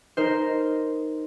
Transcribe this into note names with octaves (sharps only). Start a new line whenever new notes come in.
D#4 A#4 C5